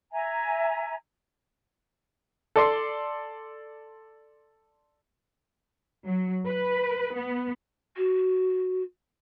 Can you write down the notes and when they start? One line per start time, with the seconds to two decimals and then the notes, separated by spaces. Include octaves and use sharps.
0.12 E5 G#5 A#5
2.56 A4 D5 C6
6.05 F#3
6.47 B4
7.14 B3
7.97 F#4